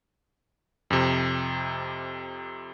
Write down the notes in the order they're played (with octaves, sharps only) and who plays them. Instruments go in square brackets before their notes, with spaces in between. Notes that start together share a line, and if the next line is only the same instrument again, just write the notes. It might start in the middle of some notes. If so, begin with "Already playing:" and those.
[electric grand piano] F2 C3